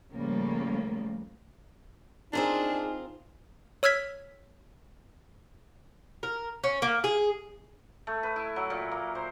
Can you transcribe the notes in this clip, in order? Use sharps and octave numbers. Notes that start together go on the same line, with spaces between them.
A2 C#3 F3 G3 A3 A#3
C4 D4 D#4 F4 G#4 A#4
C#5 E6 F6 G#6 B6
A#4
C#4
A#3
G#4
A3
B4
E4
F#3
A#2
A#3
C5